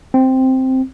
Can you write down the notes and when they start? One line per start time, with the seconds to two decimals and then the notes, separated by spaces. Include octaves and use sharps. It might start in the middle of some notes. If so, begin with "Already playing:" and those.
0.14 C4